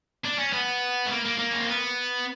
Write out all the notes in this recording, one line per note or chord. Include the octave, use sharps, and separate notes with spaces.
D4
C#4
B3
A3
A#3
A#3
A#3
C#4
C4
B3